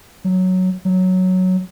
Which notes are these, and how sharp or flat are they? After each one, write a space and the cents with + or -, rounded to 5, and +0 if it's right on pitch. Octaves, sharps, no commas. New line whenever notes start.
F#3 +0
F#3 +0